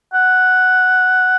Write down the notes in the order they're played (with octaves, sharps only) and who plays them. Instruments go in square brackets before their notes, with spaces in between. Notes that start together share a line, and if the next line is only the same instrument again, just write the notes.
[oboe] F#5